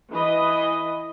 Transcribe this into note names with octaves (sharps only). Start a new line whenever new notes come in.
E3 B4 D#5